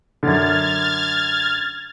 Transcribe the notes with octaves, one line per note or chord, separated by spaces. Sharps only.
F#2 D3 F6 G#6 A6